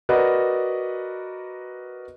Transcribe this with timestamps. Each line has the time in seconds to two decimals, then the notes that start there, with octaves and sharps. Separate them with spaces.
0.09 F#4 A#4 B4 D5 D#5